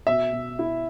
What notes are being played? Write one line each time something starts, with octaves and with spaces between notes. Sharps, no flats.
B2 E5
B2
E4